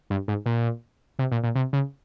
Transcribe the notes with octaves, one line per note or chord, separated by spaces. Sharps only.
G2
G#2
A#2
C3
A#2
A#2
C3
C#3